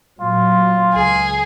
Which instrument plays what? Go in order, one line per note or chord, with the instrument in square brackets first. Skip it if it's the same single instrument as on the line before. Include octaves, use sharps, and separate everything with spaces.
[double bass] A#2 F#3 [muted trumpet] F4
[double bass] C#2 [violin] G#4